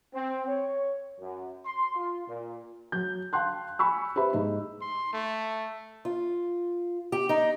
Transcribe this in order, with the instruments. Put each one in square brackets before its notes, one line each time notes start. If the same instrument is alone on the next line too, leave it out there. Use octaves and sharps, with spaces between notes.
[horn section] C4
C#5
F#2
C6
F4
A#2
[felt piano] F#3 G6
F5 G5 A5 C6 F#6
G#5 B5 C#6 E6
G4 B4 C5 E5 B5
G#2 D#4
[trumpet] C6
A3
[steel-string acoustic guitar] F4
G4
D#4